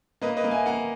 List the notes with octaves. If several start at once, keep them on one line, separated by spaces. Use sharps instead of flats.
A#3 B4 D#5
B4 D#5
A#3
E5 G#5
A#3 F#5 A#5